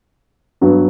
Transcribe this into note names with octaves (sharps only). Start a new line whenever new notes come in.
G2 F#3 B3